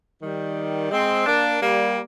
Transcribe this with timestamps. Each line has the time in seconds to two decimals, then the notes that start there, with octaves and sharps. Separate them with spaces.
0.22 D#3 G3
0.91 G#3 C4
1.26 A#3 D4
1.62 G3 A#3